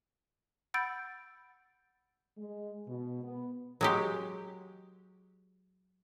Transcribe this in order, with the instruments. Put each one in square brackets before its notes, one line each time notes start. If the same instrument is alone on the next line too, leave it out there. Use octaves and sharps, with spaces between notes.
[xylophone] F#5 B5 E6 G6 A6 D7
[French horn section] G#3
B2
B3
[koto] F#3 G#3 G4